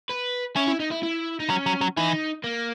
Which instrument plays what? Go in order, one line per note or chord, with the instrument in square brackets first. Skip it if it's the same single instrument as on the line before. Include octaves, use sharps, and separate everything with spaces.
[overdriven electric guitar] B4
[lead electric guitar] C#4 [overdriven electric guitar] E4
[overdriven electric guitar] E4
D#4
E4
E4
D#4
[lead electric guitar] F#3 [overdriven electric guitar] C#4
[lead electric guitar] F#3
F#3
[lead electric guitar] E3 [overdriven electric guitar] D#4
[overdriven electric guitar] A#3